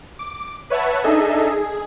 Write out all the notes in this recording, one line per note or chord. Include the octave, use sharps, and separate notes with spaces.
D6
B4 C#5 E5 F#5 A5
D4 D#4 G#4 A4 D#5 E5
G#4